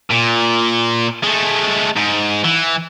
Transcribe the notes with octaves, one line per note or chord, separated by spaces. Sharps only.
A#2
G#3 A3
G#2
E3